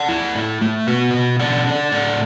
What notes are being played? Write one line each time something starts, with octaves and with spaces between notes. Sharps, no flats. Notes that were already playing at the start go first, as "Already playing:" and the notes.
Already playing: D5 F#5
E4
A2
A3
B2 F#4 B4
B2
D4 D5 F#5
D4
A2 D5 F#5